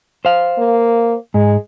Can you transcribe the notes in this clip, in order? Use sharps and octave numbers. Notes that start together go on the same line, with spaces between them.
C5 F5
A#3
G#2 G#3